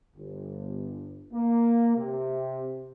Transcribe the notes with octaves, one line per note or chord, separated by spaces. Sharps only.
G1
A#3
C3